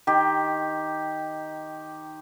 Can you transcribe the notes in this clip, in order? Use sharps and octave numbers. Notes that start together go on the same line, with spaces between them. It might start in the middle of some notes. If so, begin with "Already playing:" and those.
D#3 G4